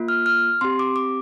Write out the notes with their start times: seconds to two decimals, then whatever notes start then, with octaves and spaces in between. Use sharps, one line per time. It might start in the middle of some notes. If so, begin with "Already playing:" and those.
Already playing: A#3 F4
0.08 F6
0.26 F6
0.61 C4 G4 C6
0.79 D6
0.96 D6